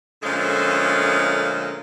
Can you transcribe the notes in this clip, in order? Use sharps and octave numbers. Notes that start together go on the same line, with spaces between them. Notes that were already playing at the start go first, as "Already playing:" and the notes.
A#2 D3 F3 G#3 A3 C#4